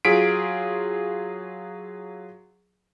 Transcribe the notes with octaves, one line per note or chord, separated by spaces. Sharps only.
F#3 F4 G#4 B6 D7